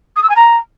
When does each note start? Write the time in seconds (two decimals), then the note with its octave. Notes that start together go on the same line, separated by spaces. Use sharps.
0.16 D#6
0.23 E6
0.29 G#5
0.36 A#5